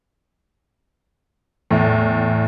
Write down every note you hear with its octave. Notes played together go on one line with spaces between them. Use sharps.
E2 A2